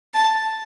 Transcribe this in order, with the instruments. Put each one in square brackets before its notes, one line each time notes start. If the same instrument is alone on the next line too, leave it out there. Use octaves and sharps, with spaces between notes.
[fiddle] A5